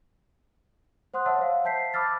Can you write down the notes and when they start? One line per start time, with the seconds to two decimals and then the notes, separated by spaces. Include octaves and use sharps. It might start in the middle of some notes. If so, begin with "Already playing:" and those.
1.14 C5 F#5 C6 D#6 F#6
1.26 C#5 E5 F#5 A5 E6
1.39 C5 F5
1.64 C5 E5 A5 G6 B6 C7
1.94 A5 B5 D6 E6 F6 A6